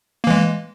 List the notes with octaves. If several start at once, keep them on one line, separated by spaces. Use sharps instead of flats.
E3 G#3 A#3